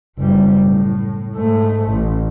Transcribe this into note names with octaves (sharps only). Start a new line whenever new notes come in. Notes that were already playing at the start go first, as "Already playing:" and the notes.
F#1 G3
A2
G#2 A3
A1